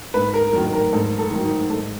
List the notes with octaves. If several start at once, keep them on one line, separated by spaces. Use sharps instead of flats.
G#2 B4
A#4
D#3 F#3 A#4
A#4
G#2 A4
A4
D#3 F#3
D#4
G#2 A4